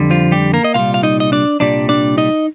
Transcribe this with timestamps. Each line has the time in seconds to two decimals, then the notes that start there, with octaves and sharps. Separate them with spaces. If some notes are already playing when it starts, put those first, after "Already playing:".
Already playing: F2 D3 G3
0.10 F3 F4
0.32 G3 G4
0.53 A#3 A#4
0.64 D#5
0.74 C2 A#2 G3 F4 F5
0.94 F5
1.03 D#4 D#5
1.20 D#5
1.32 D4 D5
1.60 C2 A#2 G3 D4 D5
1.89 D4 D5
2.18 D#4 D#5